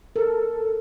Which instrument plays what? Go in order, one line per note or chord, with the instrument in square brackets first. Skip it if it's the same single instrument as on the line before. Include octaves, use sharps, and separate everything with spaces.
[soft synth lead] A4 [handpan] A#4